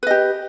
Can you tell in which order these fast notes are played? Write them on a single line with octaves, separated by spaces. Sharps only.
B4 D#5 G4